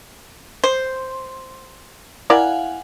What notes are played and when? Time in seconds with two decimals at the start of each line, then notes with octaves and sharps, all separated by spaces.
0.64 C5
2.30 E4 A#4 D5 F5 F#5 G#5